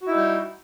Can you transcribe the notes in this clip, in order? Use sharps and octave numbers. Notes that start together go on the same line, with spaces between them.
G3 D#4 E4 F#4